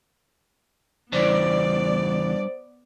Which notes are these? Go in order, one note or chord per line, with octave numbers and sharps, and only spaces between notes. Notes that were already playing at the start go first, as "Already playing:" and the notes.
E2 G2 C#3 E3 B3 C5 D5